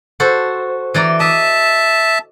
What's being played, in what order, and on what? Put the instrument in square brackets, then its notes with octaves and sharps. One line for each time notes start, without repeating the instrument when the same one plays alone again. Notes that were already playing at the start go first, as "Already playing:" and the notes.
[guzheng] F#4 A4 C5
E3 D5 A#5
[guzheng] D#5 [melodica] E5 A5